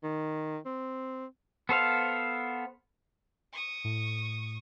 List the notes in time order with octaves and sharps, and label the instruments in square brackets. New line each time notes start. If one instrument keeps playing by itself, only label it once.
[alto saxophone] D#3
C4
[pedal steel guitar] B3 A4 C5 F5
[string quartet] C#6 D#6
[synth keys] A2